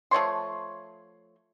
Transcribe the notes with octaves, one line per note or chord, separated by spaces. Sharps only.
F3 A3 C#5 C6